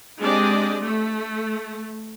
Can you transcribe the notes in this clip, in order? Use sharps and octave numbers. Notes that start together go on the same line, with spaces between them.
G#3 C4 D4 G4 D5 D#5
A3